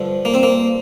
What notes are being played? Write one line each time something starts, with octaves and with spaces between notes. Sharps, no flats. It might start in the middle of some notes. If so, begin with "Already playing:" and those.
Already playing: G2 D3 F3
A#3
C4
A#3